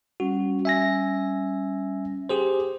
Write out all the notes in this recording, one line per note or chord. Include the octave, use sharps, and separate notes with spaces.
G3 C#4 F#4
E5 G#5 A#6
G4 G#4 C5